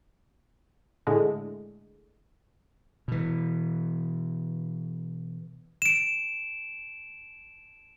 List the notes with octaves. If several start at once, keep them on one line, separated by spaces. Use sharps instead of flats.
A2 D3 G#3 A3
B2 E3
D7 E7